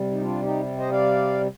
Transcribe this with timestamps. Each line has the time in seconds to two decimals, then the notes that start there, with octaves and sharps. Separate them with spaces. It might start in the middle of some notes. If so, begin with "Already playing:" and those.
Already playing: C3 G3
0.11 D#4
0.22 D4 F4
0.42 D#4 G4
0.77 C5 D#5
0.92 D5 F5